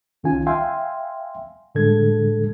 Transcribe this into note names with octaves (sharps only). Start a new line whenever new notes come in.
C2 D#3 C#4 F4 G#5
E5 F5 G5 G#5 C6
A2 D3 G3 G#3 A4 G#6